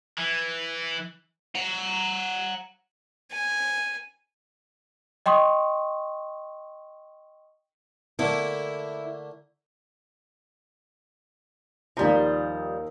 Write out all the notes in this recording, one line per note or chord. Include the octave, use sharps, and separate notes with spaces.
E3
F#5 A#5
G#5
D#5 G5 C6 C#6 D#6
D3 A3 A#3 E4
D#2 F3 G3 A#5